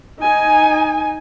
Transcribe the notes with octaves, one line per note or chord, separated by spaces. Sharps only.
D#4 G#5